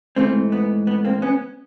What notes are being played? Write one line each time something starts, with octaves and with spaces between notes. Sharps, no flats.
G#2 E3 A3 A#3 C4
B3
B3
A#3 C4
B3 C#4